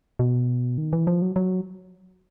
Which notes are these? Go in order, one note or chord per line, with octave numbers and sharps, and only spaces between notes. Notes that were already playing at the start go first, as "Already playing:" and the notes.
B2
D#3
E3
F3
F#3
F#3